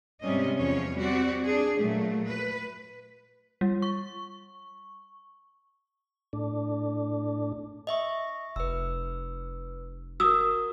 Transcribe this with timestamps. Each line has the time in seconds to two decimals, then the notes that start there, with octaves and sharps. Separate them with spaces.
0.21 G#2 C3 G3 C#4 D#5
0.57 E2 F3 C#4 C#5
0.96 G3 C4 F#4 D5
1.43 D4 G#4
1.77 A#2 F#3 A3
2.26 B4
3.61 G3
3.82 C#6
6.33 A2 D4
7.87 D#5 E5 C#6
8.56 F1 B4 E6
10.20 F#4 A#4 D#6 E6